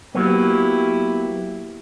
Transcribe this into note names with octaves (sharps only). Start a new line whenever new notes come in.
F#3 A#3 B3 E4 G4